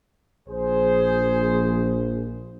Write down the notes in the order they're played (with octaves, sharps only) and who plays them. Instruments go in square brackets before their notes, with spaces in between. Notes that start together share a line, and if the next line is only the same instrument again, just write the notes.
[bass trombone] A#1 [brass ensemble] G#4 C5